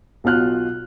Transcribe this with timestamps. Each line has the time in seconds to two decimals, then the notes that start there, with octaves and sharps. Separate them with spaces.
0.24 B1 B2 F4 F6 F#6